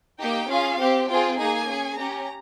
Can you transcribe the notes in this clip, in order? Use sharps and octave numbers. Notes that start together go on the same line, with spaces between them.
A#3 D#4 G4 G5
C#4 F4 G#4 F5
C4 G4
C4 F4 G#4 G5
A#3 D#4 G#4 G#5
C#4 G#4
C#4 G4 A#5